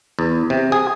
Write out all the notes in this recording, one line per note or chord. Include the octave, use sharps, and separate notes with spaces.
E2
C3
G#4